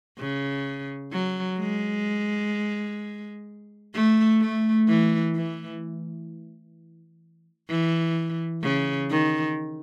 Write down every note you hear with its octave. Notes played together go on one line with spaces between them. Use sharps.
C#3
F#3
G#3
A3
A3
E3
E3
E3
C#3
D#3